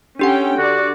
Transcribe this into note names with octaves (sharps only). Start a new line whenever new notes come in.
C#4 D4 G4 A4 F#5 G5
D3 F#4 D5